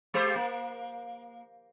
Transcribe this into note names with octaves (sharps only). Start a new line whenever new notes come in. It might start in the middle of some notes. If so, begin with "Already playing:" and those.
G#3 G4 C5
A#3